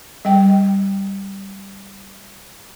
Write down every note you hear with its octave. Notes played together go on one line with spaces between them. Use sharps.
G3 G5